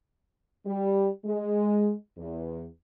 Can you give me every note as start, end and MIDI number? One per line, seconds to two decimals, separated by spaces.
0.66 1.08 55
1.25 1.92 56
2.18 2.65 40